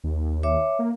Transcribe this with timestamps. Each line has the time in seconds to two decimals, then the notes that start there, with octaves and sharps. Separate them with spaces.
0.04 D#2
0.43 C#5 E5 D6
0.79 A#3